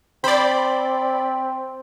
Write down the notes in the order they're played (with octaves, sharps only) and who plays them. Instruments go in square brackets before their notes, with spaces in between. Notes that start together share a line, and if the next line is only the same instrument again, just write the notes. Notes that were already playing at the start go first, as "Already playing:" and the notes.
[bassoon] C4 [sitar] C5 [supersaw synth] D5 B5